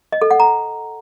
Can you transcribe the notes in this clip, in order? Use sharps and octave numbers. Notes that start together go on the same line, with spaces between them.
D#5
A4
F#5
A#5